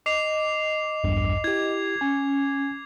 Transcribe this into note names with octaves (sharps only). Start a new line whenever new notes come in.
D#5 D6 C7 F7
A#1 E2 G2
E4 G4 G#6
C#4 G#5